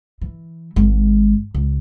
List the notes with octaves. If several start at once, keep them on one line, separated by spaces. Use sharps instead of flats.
E3
G#1 G#2
C#2